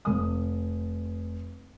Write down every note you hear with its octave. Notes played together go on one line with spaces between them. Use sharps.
F1 D#6